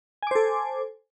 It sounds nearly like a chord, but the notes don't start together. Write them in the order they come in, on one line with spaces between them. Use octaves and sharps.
G#5 D6 C5 A4